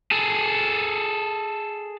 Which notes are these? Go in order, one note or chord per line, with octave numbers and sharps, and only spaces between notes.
G#4 A4